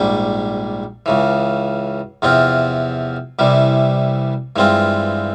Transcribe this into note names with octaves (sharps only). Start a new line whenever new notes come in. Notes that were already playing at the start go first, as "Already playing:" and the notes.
Already playing: A#1 G#2 G3
C#2 C#3 E3
E2 C3 F3 C4 F4
C2 C3 E3 G3
G2 E3 G#3 C4 F4